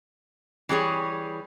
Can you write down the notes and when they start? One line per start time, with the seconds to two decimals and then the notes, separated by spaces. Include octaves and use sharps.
0.69 E3 G3 G#4 C#5